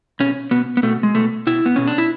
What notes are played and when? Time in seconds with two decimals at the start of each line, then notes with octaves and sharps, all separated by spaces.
0.20 B2 C#4
0.51 B2 B3
0.77 B3
0.83 B2 A3
1.03 G#3
1.15 B2 A3
1.47 B2 E4
1.66 B3
1.76 B2 C#4
1.87 D4
1.98 E4